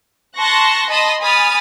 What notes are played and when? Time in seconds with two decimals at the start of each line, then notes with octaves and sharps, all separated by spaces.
0.36 A5 C6 C#6 F#6 A#6
0.89 D#5 A5 B5 C6 D#6 A#6
1.20 G#5 B5 D#6 F6 A6